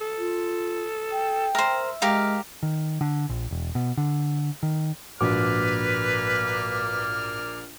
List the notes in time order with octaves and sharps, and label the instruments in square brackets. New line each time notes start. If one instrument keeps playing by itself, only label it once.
[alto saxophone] A4
[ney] F4
G5
[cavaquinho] A#4 C5 [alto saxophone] E5
[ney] G#3 [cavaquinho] G4 A#4 F5
[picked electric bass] D#3
D3
A#1
E1
B2
D3
D#3
[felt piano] A#1 [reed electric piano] G#2 F#4 D6 [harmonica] A#3 D5 F6 [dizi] B4